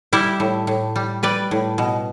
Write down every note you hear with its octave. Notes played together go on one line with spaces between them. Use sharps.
G3 E4 G4
A2
A2
G3
G3 B4 D5
A2
B2